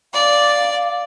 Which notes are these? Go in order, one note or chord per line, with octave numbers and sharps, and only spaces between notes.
D5 F5